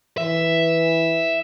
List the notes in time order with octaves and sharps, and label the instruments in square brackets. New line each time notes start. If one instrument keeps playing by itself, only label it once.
[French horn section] E3 [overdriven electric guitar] E5